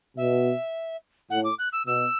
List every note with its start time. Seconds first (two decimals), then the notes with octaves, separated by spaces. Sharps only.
0.17 B2 E5
1.30 A2 F#5
1.44 D6
1.59 F#6
1.72 E6
1.86 B2 E6